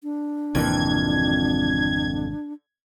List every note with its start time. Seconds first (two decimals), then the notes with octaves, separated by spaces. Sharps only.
0.03 D4
0.55 G#1 F2 C3 E3 A#3 G#6